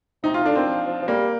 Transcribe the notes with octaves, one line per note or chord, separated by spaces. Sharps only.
C3 D#4
F4
D3 D4
D#3 C4
F3
F3
F3
G3 A#3